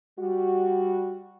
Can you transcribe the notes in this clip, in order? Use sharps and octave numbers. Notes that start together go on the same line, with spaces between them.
G3 F#4